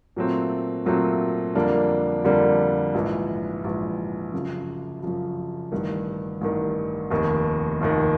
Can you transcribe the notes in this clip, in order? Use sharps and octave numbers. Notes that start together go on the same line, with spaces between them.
A#2 F#3 A3 C4
A#2 F#3 A3 C4
F2 D3 G3 A#3 D4
F2 D3 G3 A#3 D4
A#1 G#2 E3
A#1 G#2 E3
F#2 C#3 F3
F#2 C#3 F3
A1 G2 D#3
A1 G2 D#3
F1 D#2 D#3
F1 D#2 D#3